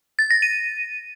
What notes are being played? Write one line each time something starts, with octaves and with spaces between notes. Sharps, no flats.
A6
A#6
D#7